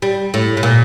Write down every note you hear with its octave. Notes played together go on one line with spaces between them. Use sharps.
G3
A2
A2
A#2